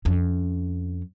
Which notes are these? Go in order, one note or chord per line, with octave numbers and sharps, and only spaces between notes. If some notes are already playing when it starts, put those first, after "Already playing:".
F2 C#4